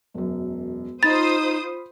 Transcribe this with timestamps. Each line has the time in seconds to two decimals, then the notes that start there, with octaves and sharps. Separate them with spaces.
0.14 E1 F#2
1.03 D#4 F4 C5 B5 D#6 A6